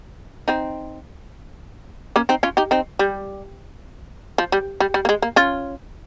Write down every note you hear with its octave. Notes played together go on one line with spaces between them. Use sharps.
C4 D#4
A#3 C#4
C4 D#4
C#4 F4
D#4 G4
C4 D#4
G3
F3
G3
G3
G3
A#3
G#3
A#3
C#4 F4